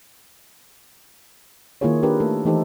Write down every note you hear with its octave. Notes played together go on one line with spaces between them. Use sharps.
D#3 A#3 E4 F4 G#4 C#5
D4 G4 A#4 B4
A3 A4
E3 A3 D#4 G4 A4 C5